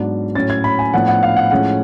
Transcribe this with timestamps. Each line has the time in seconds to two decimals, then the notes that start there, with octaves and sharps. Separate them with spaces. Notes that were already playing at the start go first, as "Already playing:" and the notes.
Already playing: G#2 F#3 B3 D4
0.35 A2 F#3 C#4 A6
0.50 G#6
0.64 B5
0.79 G#5
0.93 A2 F3 B3 D4 F#5
1.08 F#5
1.23 F5
1.37 F#5
1.51 A2 F3 G#3 C#4 F#5